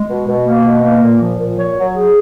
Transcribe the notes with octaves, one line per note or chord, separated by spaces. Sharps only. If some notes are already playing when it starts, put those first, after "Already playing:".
Already playing: G#3
B2
B2
A#3
B2
A#3
A#2
F3
A#2
C#5
F#3
G#4